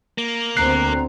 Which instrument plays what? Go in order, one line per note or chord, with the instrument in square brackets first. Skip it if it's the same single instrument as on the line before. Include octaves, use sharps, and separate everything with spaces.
[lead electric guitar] A#3
[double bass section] D2 B3 C4 [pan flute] A#5 [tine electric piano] F#6 C7